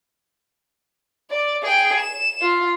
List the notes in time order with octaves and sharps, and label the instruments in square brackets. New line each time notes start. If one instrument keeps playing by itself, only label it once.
[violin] D5
G#4 G5
E7
F4